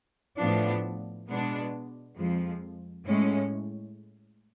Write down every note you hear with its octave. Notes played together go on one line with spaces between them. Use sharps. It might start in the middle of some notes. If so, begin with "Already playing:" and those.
A2 F3 B3 D4
B2 G#3 B3 D4
F2 F3 G#3
A2 G#3 C#4